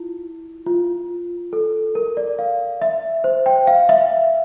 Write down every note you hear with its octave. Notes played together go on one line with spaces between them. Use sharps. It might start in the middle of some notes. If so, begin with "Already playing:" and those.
Already playing: E4 F4
F4
A4
A#4
D5
F5
E5
C5
G5
F5
E5